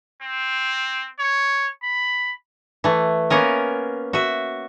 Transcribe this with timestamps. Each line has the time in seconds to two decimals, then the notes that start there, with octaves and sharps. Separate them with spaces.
0.22 C4
1.19 C#5
1.83 B5
2.84 E3 A3
3.30 A#3 B3 C#4 A#4
4.13 F#4 E5